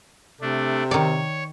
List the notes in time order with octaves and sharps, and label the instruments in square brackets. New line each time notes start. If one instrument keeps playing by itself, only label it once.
[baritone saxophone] C3 [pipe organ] A3 D4
[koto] D#3 D5 [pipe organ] C#5